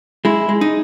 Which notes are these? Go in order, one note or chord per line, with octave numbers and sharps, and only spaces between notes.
G#3 E4
G#3
D#4